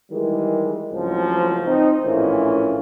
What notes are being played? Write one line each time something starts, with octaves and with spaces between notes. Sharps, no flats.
D#3 E3 G3 G#3
C#2 A2 F3 F#3 C4
C4 D#4
A#1 A2 E3 C#4 F4